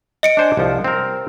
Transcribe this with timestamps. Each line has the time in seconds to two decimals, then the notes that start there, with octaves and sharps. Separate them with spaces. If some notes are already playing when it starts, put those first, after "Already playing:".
0.23 D#5 C#7 D7
0.37 D4 C5 G#5
0.57 C2 F3
0.84 C4 A#4